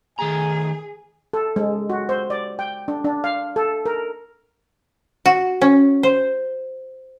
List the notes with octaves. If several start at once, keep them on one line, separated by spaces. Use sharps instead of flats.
D#3 A3 G#4 G#5 A#5
A4
G#3
F#4
C5
D5
G5
D4
D4
F5
A4
A#4
F#4
C#4
C5